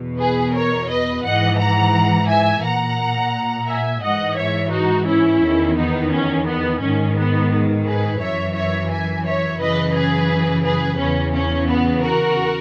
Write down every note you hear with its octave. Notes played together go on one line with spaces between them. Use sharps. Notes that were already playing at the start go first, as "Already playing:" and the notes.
Already playing: E2 B2
G#4 B4
A#4 C#5
B4 D#5
G#2 E3 D#5 F#5
F#5 A#5
E5 G#5
A#2 F#5 A#5
E5 G#5
G#2 E3 D#5 F#5
C#5 E5
D#4 F#4
C#4 E4
E2 D#3
B3 D#4
C#4
B3
G#2 D#3 C#4
B3
G#4 B4
F#2 E3 C#5 E5
C#5 E5
E5 G#5
C#5 E5
F#2 C#3 E3 B4 D#5
G#4 B4
G#4 B4
E2 C#3 E3 C#4
C#4
B3
F#4 A#4